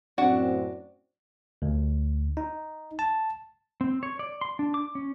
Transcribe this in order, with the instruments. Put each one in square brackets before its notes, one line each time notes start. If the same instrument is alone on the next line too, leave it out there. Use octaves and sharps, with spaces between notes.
[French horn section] F#2 A2 C4 [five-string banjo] D4 F#4 F#5
[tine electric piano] D2
D#4
A5
[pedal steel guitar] C4
C#5
D5
C6
D4
D6
C#4